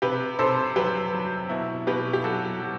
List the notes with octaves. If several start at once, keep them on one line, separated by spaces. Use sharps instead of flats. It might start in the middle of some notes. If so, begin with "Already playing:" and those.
C3 G4 B4
C3 A4 C5
F#3 G4 B4
F#3
B2 E4
B2 G4 B4
G4
F#3 F#4 A4
F#3